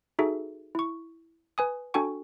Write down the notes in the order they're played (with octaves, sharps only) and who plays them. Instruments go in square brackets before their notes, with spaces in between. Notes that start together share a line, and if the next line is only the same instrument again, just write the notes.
[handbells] D#4 F#4 G#4 A4 E5
E4 C#6
B4 G#5 D#6
D4 F#4 A4 G5 G#5 C#6